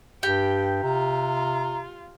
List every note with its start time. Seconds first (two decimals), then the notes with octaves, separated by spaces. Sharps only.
0.23 G2 G4 G5
0.83 C3 F4 A#5